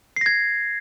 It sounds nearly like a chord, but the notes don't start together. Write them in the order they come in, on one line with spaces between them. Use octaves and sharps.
C7 A#6 G#6